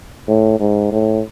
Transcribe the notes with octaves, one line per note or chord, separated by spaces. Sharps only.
A2
G#2
A2